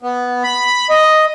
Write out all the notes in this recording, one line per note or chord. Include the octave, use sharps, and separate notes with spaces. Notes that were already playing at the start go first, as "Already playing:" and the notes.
B3
B5
D#5